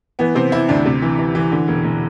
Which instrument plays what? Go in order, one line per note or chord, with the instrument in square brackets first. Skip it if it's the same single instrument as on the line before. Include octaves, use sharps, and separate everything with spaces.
[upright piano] E3 B3
C3 C4
E3 E4
D2 D4
C3
E3
E3
E3
D3
E1
E1